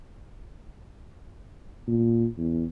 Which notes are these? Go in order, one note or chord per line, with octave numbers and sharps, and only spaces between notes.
A#2
E2